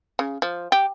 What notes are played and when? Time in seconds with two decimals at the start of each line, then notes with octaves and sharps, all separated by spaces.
0.19 C#3
0.42 F3
0.72 G4